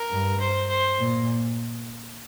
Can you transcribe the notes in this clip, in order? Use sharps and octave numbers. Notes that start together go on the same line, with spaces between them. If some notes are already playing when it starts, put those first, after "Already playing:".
Already playing: A#4
G2
C5
C5
A#2